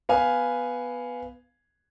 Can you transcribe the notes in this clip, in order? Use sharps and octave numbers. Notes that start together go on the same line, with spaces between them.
B3 F5 G#5